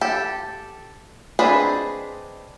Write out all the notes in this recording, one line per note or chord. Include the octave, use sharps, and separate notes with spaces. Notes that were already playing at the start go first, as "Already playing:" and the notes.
G4 A4
C4 D4 D#4 G#4 B4